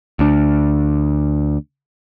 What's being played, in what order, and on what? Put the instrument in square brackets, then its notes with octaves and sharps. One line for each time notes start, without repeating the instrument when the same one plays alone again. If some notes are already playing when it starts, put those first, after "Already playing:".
[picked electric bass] D2 D4